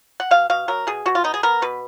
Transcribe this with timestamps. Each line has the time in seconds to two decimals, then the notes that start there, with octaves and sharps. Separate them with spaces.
0.20 F#5
0.31 B2 F5
0.50 B2 F5
0.68 F#3 A#4
0.87 B2 G#4
1.06 B2 F#4
1.15 F4
1.24 B3 D#4
1.34 G#4
1.43 B3 A#4
1.62 B2 B4